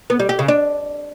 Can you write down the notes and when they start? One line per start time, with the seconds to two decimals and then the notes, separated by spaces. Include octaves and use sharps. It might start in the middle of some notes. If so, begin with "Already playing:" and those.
0.10 B3
0.20 G3
0.29 G4
0.39 C#3
0.48 D4